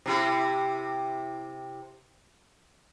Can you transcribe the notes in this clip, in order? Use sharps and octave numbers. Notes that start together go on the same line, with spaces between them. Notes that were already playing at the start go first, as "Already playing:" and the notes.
C3 E4 G4